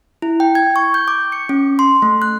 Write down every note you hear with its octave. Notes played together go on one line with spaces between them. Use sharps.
E4
G5
G#6
C#6
G6
D6
C#7
C#4
C6
A3
F#6